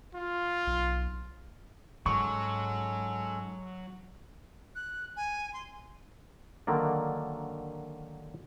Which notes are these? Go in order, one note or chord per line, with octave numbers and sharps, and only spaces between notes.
F4
B1
G#2 F#3 G#3 C#4 A4 C#6
F#6
G#5
C6
D3 D#3 F#3 A#3 D5